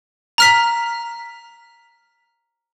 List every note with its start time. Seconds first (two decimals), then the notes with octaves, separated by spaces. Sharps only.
0.38 A#5 F6 B6